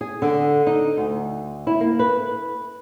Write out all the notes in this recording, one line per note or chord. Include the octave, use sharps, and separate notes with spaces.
G#4
D3
D#4
D2
E4
A#3
B4